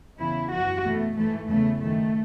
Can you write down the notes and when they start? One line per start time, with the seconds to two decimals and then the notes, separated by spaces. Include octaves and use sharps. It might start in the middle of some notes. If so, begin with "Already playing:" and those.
0.19 E2 C#3 E3 E4
0.51 F#2 E3 F#4
0.84 E2 B2 A3
1.16 G#2 E3 A3
1.48 E2 C#3 E3 A3
1.80 F#2 D#3 A3